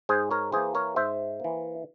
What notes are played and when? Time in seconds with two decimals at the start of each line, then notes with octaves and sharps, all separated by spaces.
0.09 G#2 G#4 C5
0.31 A#4 C#5
0.52 E3 A#3 G#4 C5
0.75 A#4 C#5
0.96 G#2 C5 E5
1.40 E3 A#3